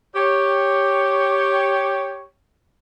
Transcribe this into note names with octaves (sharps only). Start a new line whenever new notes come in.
G4 C#5